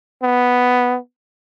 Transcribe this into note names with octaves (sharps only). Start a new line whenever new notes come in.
B3